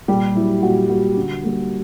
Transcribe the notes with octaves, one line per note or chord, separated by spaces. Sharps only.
A#2 G3 G4
F#3 A#3 E4
A#2 F#4
F#3 A#3 F#4
D3
G3 A#3